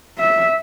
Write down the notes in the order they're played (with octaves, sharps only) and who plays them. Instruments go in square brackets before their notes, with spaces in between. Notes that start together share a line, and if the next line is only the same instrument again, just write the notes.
[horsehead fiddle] E5